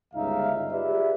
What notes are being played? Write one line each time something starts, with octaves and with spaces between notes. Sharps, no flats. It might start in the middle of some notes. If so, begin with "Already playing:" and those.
G1 C#2 G3 D#4 E5 F5
F4 G4 G#4 B4 D5 E5